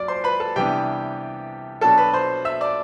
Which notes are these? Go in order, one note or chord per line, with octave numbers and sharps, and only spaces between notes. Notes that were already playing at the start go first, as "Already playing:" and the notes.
Already playing: F#2 F#3 D5 D6
C5 C6
B4 B5
A4 A5
C3 E3 G3 B3 D4 G4 G5
B2 F#3 B3 D4 A4 A5
B4 B5
C5 C6
E5 E6
D5 D6